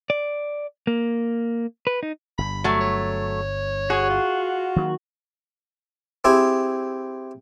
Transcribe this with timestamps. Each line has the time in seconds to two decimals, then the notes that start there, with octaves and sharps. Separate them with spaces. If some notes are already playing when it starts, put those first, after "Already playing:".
0.10 D5
0.87 A#3
1.87 B4
2.03 D#4
2.38 G1 G2 B5
2.64 F#3 A3
2.81 C#5
3.90 F#4 G#4
4.10 F4
4.76 D#3 F#3 A#3
6.24 C4 E4 G4 G#4 C5